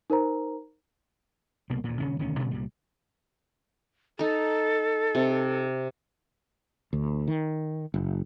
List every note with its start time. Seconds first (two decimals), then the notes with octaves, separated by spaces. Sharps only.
0.10 D#4 A#4 C5 A#5
1.70 C2 B2 A#3
1.84 D2 A#2
2.00 D#1 C#3 C#4
2.19 E1 D2 D#3 C#4
2.39 A#2 C#3 G3 B3
2.52 C2 A#2 G3
4.19 D#4 A4 A#5
5.15 C3
6.93 D2
7.28 D#3
7.94 F#1